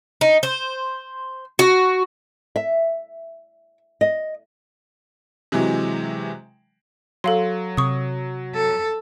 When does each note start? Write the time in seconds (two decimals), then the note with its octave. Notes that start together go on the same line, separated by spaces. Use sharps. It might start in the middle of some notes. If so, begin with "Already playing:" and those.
0.21 D#4
0.43 C5
1.59 F#4
2.56 E5
4.01 D#5
5.52 C3 E3 F#3 G#3
7.24 F#3 A4 F5 C6
7.77 C3 C#6 D#6
8.54 A4